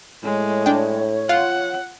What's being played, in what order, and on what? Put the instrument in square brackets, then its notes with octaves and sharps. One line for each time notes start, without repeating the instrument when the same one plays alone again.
[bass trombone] A2 [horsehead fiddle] G#3 [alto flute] C#5
[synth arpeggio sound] D4 G5
[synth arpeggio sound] F4 [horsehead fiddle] F#5